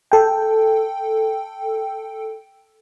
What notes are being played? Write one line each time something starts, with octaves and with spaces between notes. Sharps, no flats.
A4 G5